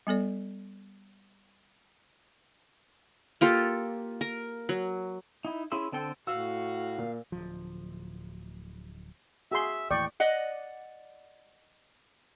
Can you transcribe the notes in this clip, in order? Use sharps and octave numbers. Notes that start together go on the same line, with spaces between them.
G3 B3 A4 D5
A#3 F4 G4 A4
A#4
F#3
D#4 E4
C#4 E4 G#4 C6 E6
D3 C4 A4 G5 E6
A2 F#4 F5 E6
A#2
D1 F3
F#4 G#4 E5 C6
D#2 A2 E3 D5 G5 C#6
D5 D#5 F#5